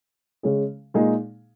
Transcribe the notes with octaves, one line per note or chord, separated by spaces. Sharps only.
C#3 G#3 C#4 G#4
A#2 G#3 D#4 G#4